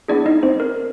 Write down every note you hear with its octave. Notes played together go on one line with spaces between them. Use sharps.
B3 D4 E4 G#4 D5
D#4 D#5
C4 C5
A#4